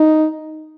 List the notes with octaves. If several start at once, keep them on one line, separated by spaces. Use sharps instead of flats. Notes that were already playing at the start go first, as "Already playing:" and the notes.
Already playing: D#4